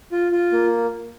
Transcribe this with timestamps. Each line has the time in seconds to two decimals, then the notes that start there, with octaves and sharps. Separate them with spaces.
0.12 F4
0.32 F4
0.52 A#3